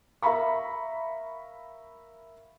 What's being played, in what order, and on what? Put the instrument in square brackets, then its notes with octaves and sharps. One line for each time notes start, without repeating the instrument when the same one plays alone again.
[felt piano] A#4 E5 F5 A#5 B5 C#6